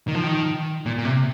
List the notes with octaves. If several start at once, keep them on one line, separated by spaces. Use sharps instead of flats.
D#3
F3
D#3
A#2
A#2
C3